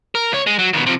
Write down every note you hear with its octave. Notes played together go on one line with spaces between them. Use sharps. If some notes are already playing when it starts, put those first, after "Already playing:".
A#4
C#2 C#5
G#3
F#3
D#2 B2
C3 F3